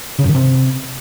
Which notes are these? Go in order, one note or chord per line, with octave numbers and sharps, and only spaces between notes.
C#3
F#2
D#3
C3